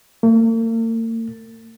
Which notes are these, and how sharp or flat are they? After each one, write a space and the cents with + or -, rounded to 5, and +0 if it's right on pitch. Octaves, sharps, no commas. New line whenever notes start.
A#3 -45